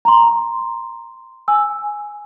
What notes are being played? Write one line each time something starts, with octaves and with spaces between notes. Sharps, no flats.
A#5 C6
G#5 E6